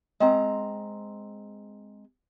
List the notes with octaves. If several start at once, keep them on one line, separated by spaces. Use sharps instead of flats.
G#3 C4 A#5